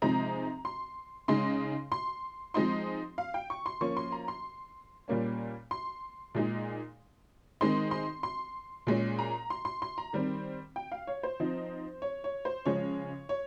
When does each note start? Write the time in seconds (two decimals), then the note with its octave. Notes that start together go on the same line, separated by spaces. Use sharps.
0.02 C3 F3 G#3 C4 D#4 A#5
0.65 C6
1.28 C#3 G#3 D#4 C6
1.92 C6
2.54 F3 G#3 C4 D#4 C6
3.18 F5
3.34 G5
3.50 C#6
3.66 C6
3.81 F3 A#3 C#4 C#6
3.97 C6
4.12 A#5
4.28 C6
5.08 A#2 G3 A#3 C#4
5.71 C6
6.35 A#2 G#3 D#4
7.61 D#3 G#3 C4 D#4 C6
7.91 C6
8.23 C6
8.87 A#2 G#3 C#4
9.19 A#5
9.50 C6
9.65 C6
9.82 C6
9.98 A#5
10.13 D#3 G3 C4
10.76 G5
10.92 F5
11.07 C#5
11.23 C5
11.40 F3 C4 D#4
12.02 C#5
12.24 C#5
12.45 C5
12.66 C#3 F3 G#3 C#5
13.29 C#5